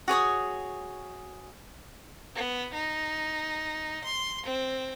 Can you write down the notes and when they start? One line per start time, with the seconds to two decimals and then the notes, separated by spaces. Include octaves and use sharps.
0.08 F#4 G#4 C#5 D#6
2.35 B3
2.74 D#4
4.04 C6
4.46 C4